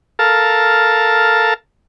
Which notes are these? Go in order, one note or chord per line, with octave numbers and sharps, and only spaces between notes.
A4 A#4 F5 A5